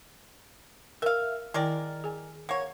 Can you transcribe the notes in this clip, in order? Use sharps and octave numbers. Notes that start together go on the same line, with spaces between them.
A#4 E5 F5
D#3 G#3 E4 A#4 D5 G5
G#4 G#5
A#3 C#5 F#5